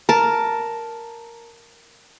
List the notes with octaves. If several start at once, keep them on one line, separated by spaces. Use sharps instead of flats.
A#4 A5